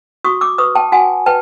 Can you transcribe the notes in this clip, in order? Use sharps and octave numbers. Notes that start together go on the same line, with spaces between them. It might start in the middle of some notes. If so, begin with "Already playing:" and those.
F#4 C#6 D#6
D6 E6
B4 C#6 D#6
G5 A5
F#4 F#5 G#5
B4 G5 A5